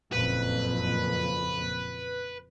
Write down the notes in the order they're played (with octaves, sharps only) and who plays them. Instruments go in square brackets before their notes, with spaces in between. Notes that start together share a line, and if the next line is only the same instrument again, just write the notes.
[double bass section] F#1 F2 A#2 [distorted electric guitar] B4